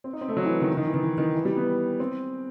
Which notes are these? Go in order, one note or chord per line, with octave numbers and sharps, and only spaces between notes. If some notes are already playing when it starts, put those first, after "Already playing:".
C4
D#4
C4
A3
F#3
E3
D#3
E3
D#3
E3
D#3
E3
D#3
E3
G3
B3
C4